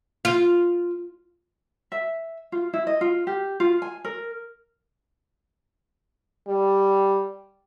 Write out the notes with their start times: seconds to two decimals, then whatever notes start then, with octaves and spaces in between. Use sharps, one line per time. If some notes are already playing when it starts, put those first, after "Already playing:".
0.25 F4
1.92 E5
2.52 F4
2.74 E4
2.87 D#5
3.01 F4
3.27 G4
3.60 F4
3.82 G#5
4.05 A#4
6.47 G3